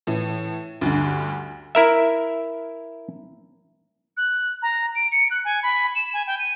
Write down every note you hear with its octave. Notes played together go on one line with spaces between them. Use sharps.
A2 E3
D2 G2 D3
E4 A#4 E5
F#6
A#5
D7
C#7
F#6
G#5
B5
E7
G#5
G5
D#7